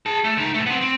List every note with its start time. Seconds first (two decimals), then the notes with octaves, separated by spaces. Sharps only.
0.06 G#4 A5
0.24 A3
0.37 C#2 D#4
0.54 B2 A3
0.66 B3 C4
0.81 C4